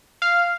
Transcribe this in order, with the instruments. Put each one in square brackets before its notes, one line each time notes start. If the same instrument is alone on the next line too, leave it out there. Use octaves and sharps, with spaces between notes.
[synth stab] F5